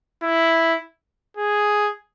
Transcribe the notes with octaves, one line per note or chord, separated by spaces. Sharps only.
E4
G#4